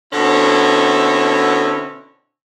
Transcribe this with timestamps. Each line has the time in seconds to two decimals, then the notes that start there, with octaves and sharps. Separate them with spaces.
0.13 B2 D3 C4 C#4 E4 A4